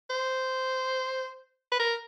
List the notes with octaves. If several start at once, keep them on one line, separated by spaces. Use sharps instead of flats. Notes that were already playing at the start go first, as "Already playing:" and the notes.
C5
B4
A#4